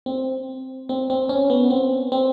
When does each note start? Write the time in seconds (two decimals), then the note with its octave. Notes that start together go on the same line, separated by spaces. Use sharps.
0.06 C4
0.89 C4
1.10 C4
1.29 C#4
1.50 B3
1.70 C4
2.12 C4